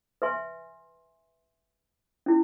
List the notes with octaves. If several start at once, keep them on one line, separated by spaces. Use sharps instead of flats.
B4 E5 G#5 C6
C#4 E4